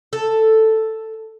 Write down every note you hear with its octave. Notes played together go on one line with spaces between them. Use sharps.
A4